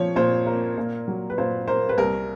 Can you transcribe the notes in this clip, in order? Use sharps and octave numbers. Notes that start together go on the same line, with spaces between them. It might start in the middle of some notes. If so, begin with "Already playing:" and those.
Already playing: A#2 F3 C#5
A#2 C5
A#3
A#2
F#3
B4
A#2 C5
A#3 C5
B4
C2 A#4